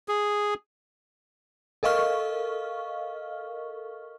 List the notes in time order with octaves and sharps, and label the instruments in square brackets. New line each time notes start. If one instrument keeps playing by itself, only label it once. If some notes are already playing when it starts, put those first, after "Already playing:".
[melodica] G#4
[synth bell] A4 A#4 D#5 F5 C#6 F6